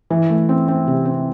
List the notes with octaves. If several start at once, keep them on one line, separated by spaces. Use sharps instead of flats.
E3
A3
C4
C4
C3
C4